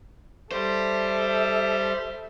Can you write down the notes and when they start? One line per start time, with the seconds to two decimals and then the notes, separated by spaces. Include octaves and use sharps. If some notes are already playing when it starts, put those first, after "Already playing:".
0.52 G3 G4 A4 C5 E5